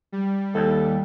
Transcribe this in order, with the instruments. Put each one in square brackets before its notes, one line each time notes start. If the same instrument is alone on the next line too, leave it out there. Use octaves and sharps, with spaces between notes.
[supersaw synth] G3
[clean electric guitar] D#2 [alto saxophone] A4